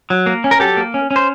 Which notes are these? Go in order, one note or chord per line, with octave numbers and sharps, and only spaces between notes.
F#3
A#3
C#4
A#4
F#3 G4 A4
A#3
C#4
C#4
C5